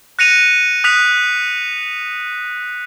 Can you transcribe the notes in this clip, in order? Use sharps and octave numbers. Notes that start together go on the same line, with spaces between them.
F#6 A#6 C#7 D#7 F7
D#6 F#6 B6 F7